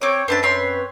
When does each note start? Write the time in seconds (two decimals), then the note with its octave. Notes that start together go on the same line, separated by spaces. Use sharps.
0.01 C4 C#5 D6
0.28 F#2 C4 D4 B4 A5
0.43 C4 C#5 C6